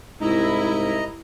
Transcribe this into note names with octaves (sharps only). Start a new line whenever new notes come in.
C2 G#2 E4 D#5 A#5